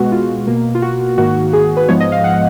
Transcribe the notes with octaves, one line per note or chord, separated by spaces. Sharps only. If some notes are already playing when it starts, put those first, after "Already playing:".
Already playing: B2 G#3 B3 F#4
F4
B2 A#3
F4
F#4
G#2 D#3 A#3 F#4
G#4
B4
G#2 F3 G#3 B3 C#5
D#5
F5
F#5